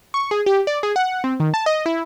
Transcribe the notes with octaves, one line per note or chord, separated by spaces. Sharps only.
C#6
G#4
G4
D5
G#4
F#5
C4
D#3
A5
D#5
E4